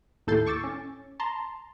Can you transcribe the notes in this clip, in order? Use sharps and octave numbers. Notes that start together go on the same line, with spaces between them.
D#2 A2 A4 G6 A6 C7
C#6 D6 E6 A6
C#4
A5 A#5 C6